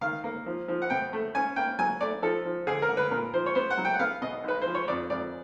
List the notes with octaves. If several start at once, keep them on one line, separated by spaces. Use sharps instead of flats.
D#3 F5
A#3
F3
F3
F#5
B2 G5
A3
C#4 G#5
A#3 G5
F#3 G#5
A3 D5
F3 A4
F3
D3 G#4
A#4
D3
B4
A#2 A#4
F3 C5
C#5
B3 C5
F#5
F#3
G5
F#5
B3 F5
B2 D#5
B1 B4
F3 C5
C#5
F2 D5
F2 D5